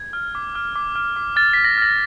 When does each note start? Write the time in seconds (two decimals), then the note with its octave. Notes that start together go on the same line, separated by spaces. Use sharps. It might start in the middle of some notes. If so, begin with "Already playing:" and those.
Already playing: G#6
0.13 F6
0.35 D6
0.55 F6
0.76 D6
0.96 F6
1.16 D6
1.36 F6 A6
1.53 F6 B6
1.64 A#6
1.78 F6 A#6